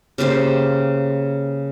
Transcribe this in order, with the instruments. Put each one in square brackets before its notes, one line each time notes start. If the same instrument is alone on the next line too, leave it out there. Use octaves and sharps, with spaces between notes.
[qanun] C#3 A#3 G4 C5